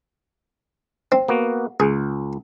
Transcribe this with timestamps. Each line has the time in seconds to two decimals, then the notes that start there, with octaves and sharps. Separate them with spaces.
1.12 C4
1.28 A#3 B3 F#4
1.80 C#2 G#4